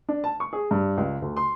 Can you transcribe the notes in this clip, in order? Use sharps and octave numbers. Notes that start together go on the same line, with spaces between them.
D4
A5
C#6
G#4
G2
C#2
D2
C6